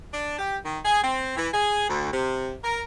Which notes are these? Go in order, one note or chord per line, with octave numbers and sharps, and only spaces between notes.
D4
G4
D#3
G#4
C4
E3
G#4
D2
C3
A#4